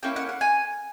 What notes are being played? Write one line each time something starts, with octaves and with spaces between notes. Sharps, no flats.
A#3 C#4 E4 G5
F#5
F#5
G#5